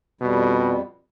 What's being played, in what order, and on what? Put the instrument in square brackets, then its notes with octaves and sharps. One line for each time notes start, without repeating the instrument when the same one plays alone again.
[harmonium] F2 G3 [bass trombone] B2